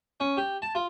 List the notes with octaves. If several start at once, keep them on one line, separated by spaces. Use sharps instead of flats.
C#4
G4
A5
F4